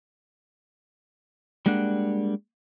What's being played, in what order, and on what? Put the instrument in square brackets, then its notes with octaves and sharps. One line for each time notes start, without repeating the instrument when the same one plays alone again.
[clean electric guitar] G3 G#3 A#3 D4 F#5